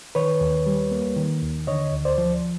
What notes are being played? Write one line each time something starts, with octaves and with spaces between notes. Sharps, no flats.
D#3 B4 C#5
D#2
G3
A#3
D#3
D#2
D3 C#5 D#5
D2
C5 D5
F3